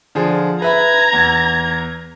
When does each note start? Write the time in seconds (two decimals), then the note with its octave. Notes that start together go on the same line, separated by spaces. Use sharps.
0.15 D3 F3 G#4
0.62 B4 E5 A#5 B5 G#6
1.13 E2